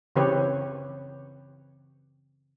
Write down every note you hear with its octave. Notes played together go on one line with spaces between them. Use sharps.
C#3 E3 C4 G4 B4 C#5